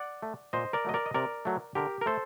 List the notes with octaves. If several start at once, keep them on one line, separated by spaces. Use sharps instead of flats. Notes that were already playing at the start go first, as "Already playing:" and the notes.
Already playing: D5 F#5
A3
A#2 C5 D#5
A#4 D5
F#3 A3 D#5
A#4 D5
D#5
C3 A#4 D5
F#3 A3
D3 G4 A#4
A#4
A3 A4 C5